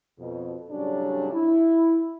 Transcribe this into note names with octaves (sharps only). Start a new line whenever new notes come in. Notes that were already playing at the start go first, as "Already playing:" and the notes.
F2 B2
A2 C#3 F#3 G3 C#4 D4
E4